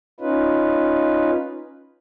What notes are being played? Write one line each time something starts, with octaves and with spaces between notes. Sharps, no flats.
C#4 D#4 F4 B4